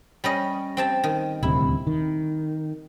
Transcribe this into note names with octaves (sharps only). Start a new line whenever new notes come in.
G3 C#4 D#5
C4 G4 A5
D#3
D#1 D2 C3 E4
D#3